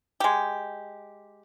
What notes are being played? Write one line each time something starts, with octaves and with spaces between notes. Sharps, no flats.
G#3 G4